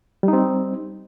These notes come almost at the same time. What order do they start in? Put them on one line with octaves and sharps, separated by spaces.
G3 D#4 C4